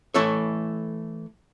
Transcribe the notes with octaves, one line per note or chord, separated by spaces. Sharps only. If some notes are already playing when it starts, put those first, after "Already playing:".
E3 A3 E4 A4 C#5